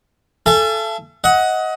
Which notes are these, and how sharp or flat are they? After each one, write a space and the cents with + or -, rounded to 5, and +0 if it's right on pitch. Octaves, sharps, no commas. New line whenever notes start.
A4 -10 E5 +45 G#5 +0
D#5 +25 F#5 +0